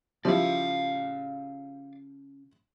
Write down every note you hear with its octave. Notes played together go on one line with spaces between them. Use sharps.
C#3 F3 G3 E4 D5 F5